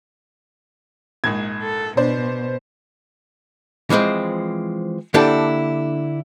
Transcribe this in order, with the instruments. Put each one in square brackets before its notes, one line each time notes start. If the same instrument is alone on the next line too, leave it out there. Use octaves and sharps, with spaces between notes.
[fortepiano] A#1 G#2 [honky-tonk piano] G#6
[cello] A4
[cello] B2 [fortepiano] D4 [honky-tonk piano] C5
[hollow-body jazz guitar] E3 F3 G#3 C4
D3 A#3 D4 E4 G4 A4